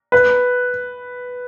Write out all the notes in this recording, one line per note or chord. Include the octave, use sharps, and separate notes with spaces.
B4